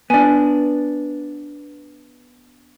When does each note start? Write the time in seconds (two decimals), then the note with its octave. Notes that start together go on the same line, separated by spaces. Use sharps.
0.10 B3 D4 G#5